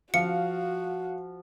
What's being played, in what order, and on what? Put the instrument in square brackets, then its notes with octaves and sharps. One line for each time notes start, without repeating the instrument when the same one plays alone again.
[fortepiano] F3 [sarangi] F#4 [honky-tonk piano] F5 [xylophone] C#7